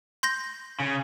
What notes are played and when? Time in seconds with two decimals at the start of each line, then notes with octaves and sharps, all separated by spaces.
0.23 C6 G6 A#6
0.80 C#3